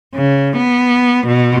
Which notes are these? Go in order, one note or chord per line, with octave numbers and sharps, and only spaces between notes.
C#3
B3
B2